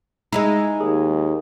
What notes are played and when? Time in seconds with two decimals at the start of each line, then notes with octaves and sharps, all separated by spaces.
0.32 G#3 D#4 E4 D#5 A#5
0.81 D#2 G#4